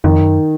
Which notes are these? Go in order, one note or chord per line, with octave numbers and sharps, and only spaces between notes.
F2 D#3
F#2